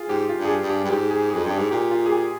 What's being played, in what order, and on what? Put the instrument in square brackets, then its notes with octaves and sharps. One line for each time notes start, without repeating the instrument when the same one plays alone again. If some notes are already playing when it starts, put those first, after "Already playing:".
Already playing: [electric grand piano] F4 G#4
[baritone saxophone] G#2 [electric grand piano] G4
[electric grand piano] F4
[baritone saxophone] G2
[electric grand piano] G#4
G4
[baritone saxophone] G2
[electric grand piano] G4
[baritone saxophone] G2
[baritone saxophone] G#2 [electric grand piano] G4
[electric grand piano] G#4
[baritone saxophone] F2 [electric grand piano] G#4
[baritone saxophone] G2
[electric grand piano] G4
[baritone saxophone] G#2
[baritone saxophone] A#2 [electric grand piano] G4
[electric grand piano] F4
G#4
G4